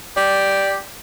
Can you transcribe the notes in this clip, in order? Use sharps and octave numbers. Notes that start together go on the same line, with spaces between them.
G4 D5